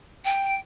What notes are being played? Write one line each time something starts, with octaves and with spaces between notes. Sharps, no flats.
G5